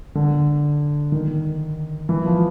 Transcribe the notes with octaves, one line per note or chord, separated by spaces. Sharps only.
D3
D#3
E3
F3